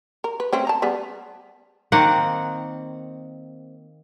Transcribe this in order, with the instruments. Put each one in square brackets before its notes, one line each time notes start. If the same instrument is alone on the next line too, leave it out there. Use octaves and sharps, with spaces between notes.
[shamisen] A#4
B4
A3 C4 C#4
A5 A#5
G3 B3 G#4
[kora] D#3 A#3 C4 F#5